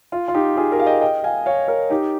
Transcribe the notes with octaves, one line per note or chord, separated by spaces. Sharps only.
F4
F4
D#4 G4
F4 G#4
G4 A#4
F5
D#5 G5
D#5 G5
F5 G#5
C#5 F5
A#4 C#5
D#4 G4